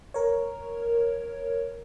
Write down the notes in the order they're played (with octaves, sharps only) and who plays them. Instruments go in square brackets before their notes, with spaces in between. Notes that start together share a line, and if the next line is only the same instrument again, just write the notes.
[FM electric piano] A#4 C#5